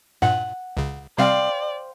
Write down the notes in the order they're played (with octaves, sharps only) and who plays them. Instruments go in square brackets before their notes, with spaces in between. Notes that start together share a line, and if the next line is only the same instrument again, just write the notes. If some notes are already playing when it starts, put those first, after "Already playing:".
[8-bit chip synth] G2 A#2 [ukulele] F#5
[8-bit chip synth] C#2 C#3
[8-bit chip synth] C3 G3 C4 [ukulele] C5 F5 G5 [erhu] D5